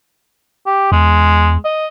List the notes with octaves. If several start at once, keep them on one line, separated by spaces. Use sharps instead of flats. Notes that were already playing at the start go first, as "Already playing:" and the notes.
G4
E2 G#3
D#5